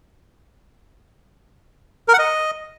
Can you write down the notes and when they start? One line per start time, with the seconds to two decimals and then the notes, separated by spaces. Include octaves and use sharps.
2.08 A#4
2.14 F#5
2.19 D#5